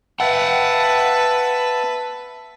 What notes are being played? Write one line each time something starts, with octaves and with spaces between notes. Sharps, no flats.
B4 E5 F#5 G5 A5